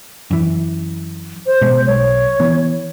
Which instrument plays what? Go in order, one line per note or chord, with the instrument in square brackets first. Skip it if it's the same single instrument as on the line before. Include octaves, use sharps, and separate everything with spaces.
[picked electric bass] F#2 E3
[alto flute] C5
[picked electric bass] B2 G#3
[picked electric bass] B1 [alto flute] C#5
[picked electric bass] E3 B3